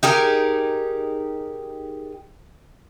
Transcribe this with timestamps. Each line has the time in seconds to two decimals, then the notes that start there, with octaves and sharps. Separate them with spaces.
0.03 D#4 G4 G#4 A#4